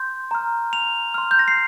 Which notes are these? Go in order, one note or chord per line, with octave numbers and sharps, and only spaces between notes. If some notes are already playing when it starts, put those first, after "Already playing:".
Already playing: C6 G6
A#5 F6
F7
C6 F6
G6
A#6
C7